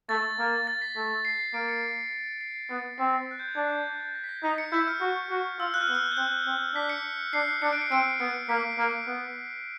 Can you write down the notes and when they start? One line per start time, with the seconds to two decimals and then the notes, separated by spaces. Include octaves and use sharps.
0.09 A3 A6
0.39 A#3
0.67 A6
0.82 B6
0.96 A3
1.25 C7
1.53 A#3 D7
1.68 C#7
2.41 C7
2.70 B3
2.98 C4 A#6
3.14 B6
3.31 F#6
3.39 G6
3.48 G#6
3.56 D4 A6
3.71 G6
3.86 F#6
4.00 G6
4.15 A#6
4.24 B6
4.29 A#6
4.43 D#4 B6
4.58 C#7
4.72 E4 G6
4.87 F6
5.01 F#4
5.30 F#4
5.59 F4 E6
5.74 F#6
5.81 F6
5.88 B3 E6
5.95 F6
6.12 G6
6.17 C4 F#6
6.46 C4
6.75 D4 B6
6.89 C#7
7.33 D4 C7
7.62 D4 C#7
7.73 D7
7.82 C#7
7.91 C4 D7
8.02 C#7
8.20 B3 C#7
8.49 A#3 B6
8.78 A#3
9.07 B3